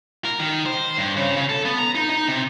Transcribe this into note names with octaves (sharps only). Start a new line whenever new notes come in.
A#4
D#3
C5
G2
C#3
C#3
A4
B3
A#5
D#4
D#4
C3